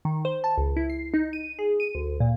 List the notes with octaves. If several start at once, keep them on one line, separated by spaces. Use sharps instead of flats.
D#3
C5
A5
C#2
E4
C7
D#4
D#7
G#4
D#7
D2
A#2